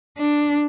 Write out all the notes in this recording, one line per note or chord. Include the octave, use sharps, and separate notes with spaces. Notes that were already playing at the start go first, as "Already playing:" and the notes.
D4